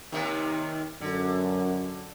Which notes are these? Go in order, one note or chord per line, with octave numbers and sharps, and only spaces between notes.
D#2 C3 D#3
F#2 D3